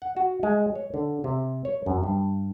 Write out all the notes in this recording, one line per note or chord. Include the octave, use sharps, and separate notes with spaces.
F#5
F#4
G#3
C#5
D3
C3
C#5
F#2
G2